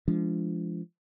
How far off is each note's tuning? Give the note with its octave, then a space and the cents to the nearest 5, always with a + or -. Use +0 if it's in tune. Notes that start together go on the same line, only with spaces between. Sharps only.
F3 -30 G#3 +0 D4 -20